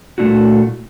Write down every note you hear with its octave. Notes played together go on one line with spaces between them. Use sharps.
A#2 A3 C#4 D4 E4 F#4